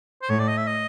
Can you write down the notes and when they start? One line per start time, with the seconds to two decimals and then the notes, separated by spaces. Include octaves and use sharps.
0.22 C5
0.29 A2 C#5
0.39 D5
0.48 D#5
0.57 E5
0.67 D#5